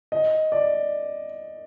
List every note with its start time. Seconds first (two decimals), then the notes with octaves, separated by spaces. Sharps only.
0.12 D#5
0.52 D5